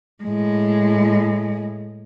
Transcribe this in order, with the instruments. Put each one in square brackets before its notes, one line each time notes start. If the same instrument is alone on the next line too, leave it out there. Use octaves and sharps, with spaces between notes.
[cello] A2 G#3